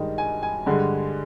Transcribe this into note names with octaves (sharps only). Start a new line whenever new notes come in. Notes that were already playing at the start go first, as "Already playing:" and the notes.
Already playing: G2 D#3 G#3 D#4
G#5
G#5
G2 D3 G#3